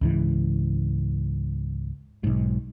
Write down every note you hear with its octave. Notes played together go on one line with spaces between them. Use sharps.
C#2 G#2 E3
B1 G#2